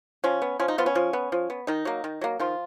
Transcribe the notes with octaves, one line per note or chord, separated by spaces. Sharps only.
F3 C#4
B3
F3 C#4
D#4
F3 B3 F4
C#4
F3
B3
F3
B3
D#3 D#4
F#3 A#3
D#3
F#3 A#3
D#3 F3 F4